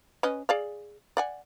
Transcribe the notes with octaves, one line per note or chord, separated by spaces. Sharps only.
C#4 B4 D#5
G#4 D5 F5
D5 F#5 G#5